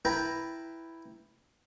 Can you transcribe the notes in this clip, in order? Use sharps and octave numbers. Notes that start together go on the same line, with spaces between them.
E4 B4 G5 A5 A#5